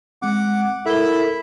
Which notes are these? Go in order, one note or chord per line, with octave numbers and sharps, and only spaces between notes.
G#3 C4 F#5 D6
E4 A4 A#4 E5